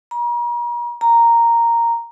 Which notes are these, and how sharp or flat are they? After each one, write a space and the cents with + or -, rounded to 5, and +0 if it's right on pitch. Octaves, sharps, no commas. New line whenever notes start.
A#5 +40
A#5 -5